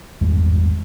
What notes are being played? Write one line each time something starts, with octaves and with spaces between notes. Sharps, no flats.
G#1 E2 G2 G#3